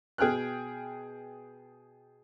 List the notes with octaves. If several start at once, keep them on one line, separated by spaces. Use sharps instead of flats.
B2 G#4 G5 F6 F#6